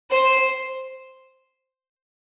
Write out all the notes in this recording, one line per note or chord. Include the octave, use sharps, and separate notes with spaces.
C5